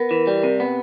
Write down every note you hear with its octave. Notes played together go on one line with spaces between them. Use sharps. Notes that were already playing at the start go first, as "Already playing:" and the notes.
Already playing: B3 A#4
E3
G3
C3
B3